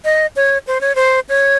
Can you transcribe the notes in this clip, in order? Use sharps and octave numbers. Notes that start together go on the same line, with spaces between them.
D#5
C#5
C5
C#5
C5
C#5